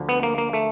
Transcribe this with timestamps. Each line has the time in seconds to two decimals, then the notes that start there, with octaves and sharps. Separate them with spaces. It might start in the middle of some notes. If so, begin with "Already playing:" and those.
Already playing: D2 D3 F3
0.09 B3
0.23 A#3
0.38 A#3
0.53 A3